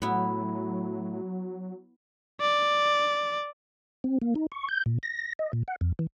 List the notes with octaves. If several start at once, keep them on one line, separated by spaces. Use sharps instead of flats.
A2 F#3 B3 E4
D5
C4
A#3
D#4
C#6
G6
A#2
A#6
D#5
A#2
F#5
F2
E3